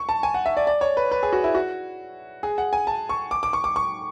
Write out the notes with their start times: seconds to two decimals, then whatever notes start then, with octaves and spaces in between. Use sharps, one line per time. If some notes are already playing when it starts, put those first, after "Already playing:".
Already playing: C#6
0.09 A5
0.23 G#5
0.34 F#5
0.46 E5
0.57 D5
0.67 D5
0.81 C#5
0.97 B4
1.11 B4
1.23 G#4
1.33 F#4
1.44 E4
1.55 F#4
2.43 G#4
2.58 F#5
2.73 G#5
2.87 A5
3.09 C#6
3.31 D6
3.43 D6
3.53 C#6
3.64 D6
3.76 C#6